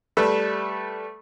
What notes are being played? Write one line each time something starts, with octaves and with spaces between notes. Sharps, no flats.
G3 A3 A4 B4